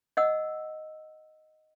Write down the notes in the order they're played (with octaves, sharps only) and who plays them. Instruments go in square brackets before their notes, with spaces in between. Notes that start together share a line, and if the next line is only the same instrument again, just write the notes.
[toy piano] D#5 F#5 E6